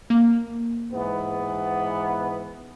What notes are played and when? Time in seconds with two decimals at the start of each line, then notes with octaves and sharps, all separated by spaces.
0.10 A#3
0.93 G#2 E3 B3